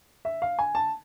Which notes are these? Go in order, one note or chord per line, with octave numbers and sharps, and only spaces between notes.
E5
F5
G#5
A5